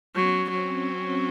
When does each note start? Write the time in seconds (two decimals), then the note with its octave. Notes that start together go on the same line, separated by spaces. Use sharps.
0.15 F#3 B3 C#4
0.50 F#3 C4
0.86 C4